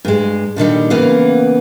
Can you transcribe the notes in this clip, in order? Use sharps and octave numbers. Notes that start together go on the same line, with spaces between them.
G2 G#3
A#2 D3 D#3 G3
D2 C#3 E3 A#3 B3 F5